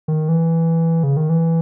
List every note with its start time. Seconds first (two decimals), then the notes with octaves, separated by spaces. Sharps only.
0.08 D#3
0.29 E3
1.03 C#3
1.17 D#3
1.30 E3